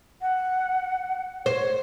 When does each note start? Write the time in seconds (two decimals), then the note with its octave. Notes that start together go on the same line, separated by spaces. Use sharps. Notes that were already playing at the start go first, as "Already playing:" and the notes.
0.22 F#5
1.46 C5 C#5